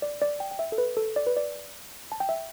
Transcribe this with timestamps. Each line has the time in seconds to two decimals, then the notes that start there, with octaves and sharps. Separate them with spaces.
0.02 D5
0.22 D5
0.40 G5
0.51 G5
0.59 E5
0.72 A4
0.78 B4
0.97 A4
1.16 D5
1.27 B4
1.37 D5
2.12 A5
2.20 G5
2.29 E5